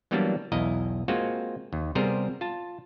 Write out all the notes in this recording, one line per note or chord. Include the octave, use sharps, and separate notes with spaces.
E3 F#3 G3 A#3 B3 D4
B1 E2 E4 D#5 F5 A#5
G#3 A#3 C4 F4 F#4
D#2
C3 G3 B3 G#4 A#4 C5
F4 A5